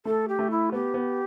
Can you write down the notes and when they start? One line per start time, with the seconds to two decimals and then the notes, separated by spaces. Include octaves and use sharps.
0.05 A3 A4
0.28 G4
0.39 A3
0.50 E4
0.72 B3 G4
0.94 B3